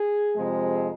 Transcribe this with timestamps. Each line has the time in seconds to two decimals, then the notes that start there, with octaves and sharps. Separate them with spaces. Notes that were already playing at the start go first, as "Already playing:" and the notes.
Already playing: G#4
0.35 F2 C3 F3 G#3